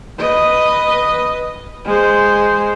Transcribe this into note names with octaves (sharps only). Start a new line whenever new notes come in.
B4 D#5
G#3 C5